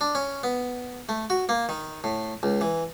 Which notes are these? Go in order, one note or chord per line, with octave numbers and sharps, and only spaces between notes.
D4
C#4
B3
A3
F#4
A#3
D#3
A2
C#2
E3